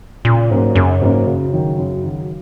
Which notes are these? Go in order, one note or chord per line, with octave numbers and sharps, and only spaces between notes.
A#2 C#3
G#2 F#3 A#3 C#4
F#2 C#3
G#2 F#3 A#3 C#4
F#2 C#3
D#3 F#3
F#2
D#3 F#3